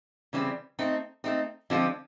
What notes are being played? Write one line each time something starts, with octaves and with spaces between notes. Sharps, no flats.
C#3 E3 G3 C4
A3 C4 D#4
A3 C4 D#4
D3 F3 G#3 C4 F4